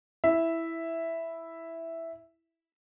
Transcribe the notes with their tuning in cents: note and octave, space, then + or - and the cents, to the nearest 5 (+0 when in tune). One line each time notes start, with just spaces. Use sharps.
E4 +0 E5 +0